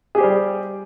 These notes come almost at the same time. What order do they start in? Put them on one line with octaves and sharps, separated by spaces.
G#4 G4 C5 G3